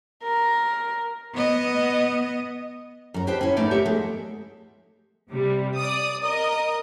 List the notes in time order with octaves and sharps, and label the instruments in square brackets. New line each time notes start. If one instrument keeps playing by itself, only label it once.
[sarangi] A#4
[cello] B3 D#5
[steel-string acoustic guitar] F#2 A#4
G4 B4 C5 D#5 G5 A5
C#4 E4
G#2 A3 D4 D#4 B4 D5
G4 A#4 E5 F#5
G#3 A3 B3 G#4
[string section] C3 G3
D5 D#6
A#4 D#5 D#6